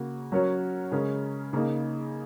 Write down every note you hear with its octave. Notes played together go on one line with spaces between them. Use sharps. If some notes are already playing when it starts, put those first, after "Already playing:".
Already playing: C#3 A#3 F#4
F#3 C#4 F#4 A#4 C#5
C#3 G#3 C#4 A#4
C#3 A#3 D#4